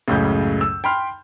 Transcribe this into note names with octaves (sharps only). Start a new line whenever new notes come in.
C#2 F#2 A2 C#3 G6
E6
G5 B5 C6 F6